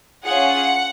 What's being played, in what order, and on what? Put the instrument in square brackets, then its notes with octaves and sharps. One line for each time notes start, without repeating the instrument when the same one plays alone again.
[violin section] C#4 F4 G#4 F#5